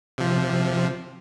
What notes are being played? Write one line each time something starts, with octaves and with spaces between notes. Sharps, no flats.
C3 F3